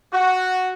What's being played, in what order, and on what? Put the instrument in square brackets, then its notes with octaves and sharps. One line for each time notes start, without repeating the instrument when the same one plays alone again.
[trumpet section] F#4